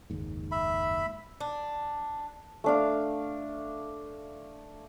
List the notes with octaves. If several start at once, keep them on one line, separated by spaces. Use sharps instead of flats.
F#1 D#2 G#2
E5 B5
D4
A3 D4 F5